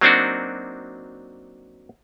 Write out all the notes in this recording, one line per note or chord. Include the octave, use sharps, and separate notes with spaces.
F#3 A#3 C4 D4 D#4 F#4